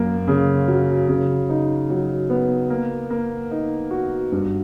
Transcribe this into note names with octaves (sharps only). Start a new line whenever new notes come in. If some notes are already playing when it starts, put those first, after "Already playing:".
Already playing: F#2 A#3
C#3
F#3
C#3
D#4
F#3
B3
A#3
A#3
D#4
F#4
G2